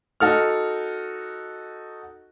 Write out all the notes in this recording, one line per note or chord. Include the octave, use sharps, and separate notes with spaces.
D#4 F#4 A4 F6